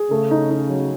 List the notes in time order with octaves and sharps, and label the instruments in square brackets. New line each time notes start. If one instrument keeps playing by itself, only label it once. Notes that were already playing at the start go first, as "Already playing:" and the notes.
Already playing: [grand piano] G#4
[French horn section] C#3 [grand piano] A3
[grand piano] D#4
D#4
F#3